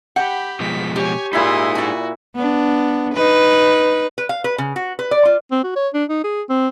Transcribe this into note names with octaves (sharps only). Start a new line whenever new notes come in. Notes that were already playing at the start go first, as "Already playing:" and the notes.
G4 F#5 G5 B5
B2 F3 G#3 B6
G4 C#5 G#5
A#2 D#4 E4 G#4 B5 C6 D#6
F#4 D5 G#5
B3 D4
D#4 B4
B4
F5
B4
C#3
F#4
B4
D5
F4
C4
F#4
C#5
D4
D#4
G#4
C4